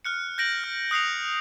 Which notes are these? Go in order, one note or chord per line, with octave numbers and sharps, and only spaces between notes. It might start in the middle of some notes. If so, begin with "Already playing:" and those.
F6 F#6 C#7
G6 A#6 D7 F#7
F6
D#6 F#6 C7 C#7 F7